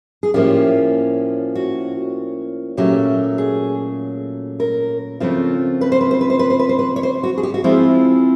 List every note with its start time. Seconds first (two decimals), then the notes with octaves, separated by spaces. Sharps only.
0.23 G#4
0.34 A2 F3 A#3 C#4 F4 G4
1.55 F#4
2.77 A#2 F#3 A3 C#4 G4
3.38 G#4
4.60 A#4
5.20 C#3 F3 A3 C4 F4
5.81 B4
5.92 C5
6.01 B4
6.11 C5
6.21 B4
6.30 C5
6.39 B4
6.50 C5
6.59 B4
6.69 C5
6.79 B4
6.96 C#5
7.03 C5
7.23 F#4
7.38 G#4
7.43 G4
7.54 F#4
7.64 F3 G#3 C4 E4 F4